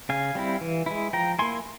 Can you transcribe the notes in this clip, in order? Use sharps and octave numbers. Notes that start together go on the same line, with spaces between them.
C#3 F5 G#5
G3 C4 E4
E3
G#3 E4
F3 G5 A#5
A#3 E4 G#5 C6